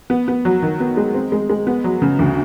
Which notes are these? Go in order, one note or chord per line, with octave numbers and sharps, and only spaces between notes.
B3
B3
F#3
D#3
B3
G#3
C4
G#3
G#3
B3
F#3
C#3
D2